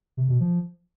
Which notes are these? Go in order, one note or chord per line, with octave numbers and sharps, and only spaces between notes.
C3
B2
F3